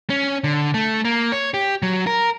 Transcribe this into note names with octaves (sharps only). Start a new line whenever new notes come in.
C#4
D3
A3
A#3
C#5
G4
F#3
A#4